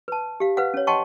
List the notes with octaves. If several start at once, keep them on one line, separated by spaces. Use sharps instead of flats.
B4 A5
G4 F5
B4 C5 F5 F#5
C#4 C#5
D#5 F#5 G5 A5 C6 C#6